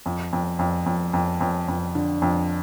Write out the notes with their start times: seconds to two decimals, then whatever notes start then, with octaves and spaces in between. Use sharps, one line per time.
0.06 F2
0.33 F2
0.59 F2
0.86 F2
1.13 F2
1.41 F2
1.68 F2
1.95 D3
2.22 F2